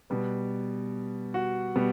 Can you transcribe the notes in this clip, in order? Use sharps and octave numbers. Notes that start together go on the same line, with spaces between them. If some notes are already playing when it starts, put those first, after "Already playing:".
B2 G3 B3
F#4
B2 G3 B3